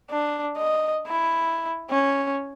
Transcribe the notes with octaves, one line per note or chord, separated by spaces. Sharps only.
D4
D#5
E4
C#4